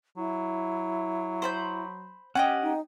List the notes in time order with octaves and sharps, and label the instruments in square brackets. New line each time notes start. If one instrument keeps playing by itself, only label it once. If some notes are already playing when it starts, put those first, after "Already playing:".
[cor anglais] F#3 [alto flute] E4
[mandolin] C5 B5 G6
[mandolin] C#4 G4 D#5 [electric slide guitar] F#5
[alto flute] D#4